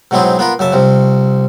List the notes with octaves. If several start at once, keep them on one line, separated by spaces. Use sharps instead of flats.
G#2 B2 F#3 C4 E4 G#4
B3 F4 A#4 B4
F#2 C#3 E5 A5
C2 C3 F3